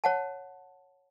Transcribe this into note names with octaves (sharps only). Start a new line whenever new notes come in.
C#5 F#5 A5